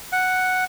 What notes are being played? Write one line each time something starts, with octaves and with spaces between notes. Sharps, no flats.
F#5